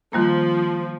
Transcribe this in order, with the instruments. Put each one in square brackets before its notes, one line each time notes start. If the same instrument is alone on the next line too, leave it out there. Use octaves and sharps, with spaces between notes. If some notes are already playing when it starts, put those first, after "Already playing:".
[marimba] D#3 G3 A#3 [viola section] F3